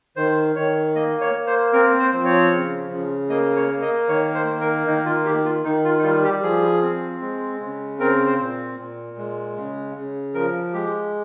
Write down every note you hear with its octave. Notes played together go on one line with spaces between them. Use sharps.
D#3 C5
D#3 C#5
A#3 D#5
C#5
A#3
C5
C4 A#4
C5
F3
C#5
C#3
C#3
A#3 D#5
C#5
A#3
D#5
D#3 C#5
C5
A#3
A#4
D#3 D#4
F4
D#3 G4
F4
D#3 D#4
F4
D#4
G3 F4
G4
F3 G#4
C4
G#3
C#3
C4 A#4
C5
A#2
A#2
G#3
C#3
C#3
F3 A#4
G#3 G4